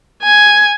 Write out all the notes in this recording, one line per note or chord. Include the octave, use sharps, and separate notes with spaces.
G#5